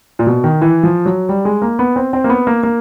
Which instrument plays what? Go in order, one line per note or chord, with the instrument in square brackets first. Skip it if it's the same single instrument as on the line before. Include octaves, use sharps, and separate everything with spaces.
[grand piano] A#2
B2
D#3
E3
F3
F#3
G3
G#3
A#3
B3
C4
C4
A#3
B3
A#3
A#3